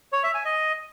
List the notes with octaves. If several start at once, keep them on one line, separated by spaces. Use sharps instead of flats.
C#5
E5
G#5
D#5